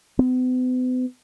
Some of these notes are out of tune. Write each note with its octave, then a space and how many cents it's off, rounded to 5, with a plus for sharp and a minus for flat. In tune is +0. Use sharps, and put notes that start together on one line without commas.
B3 +45